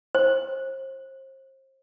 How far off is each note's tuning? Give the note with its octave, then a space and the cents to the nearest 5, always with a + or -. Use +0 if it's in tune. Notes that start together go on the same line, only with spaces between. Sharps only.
C5 +35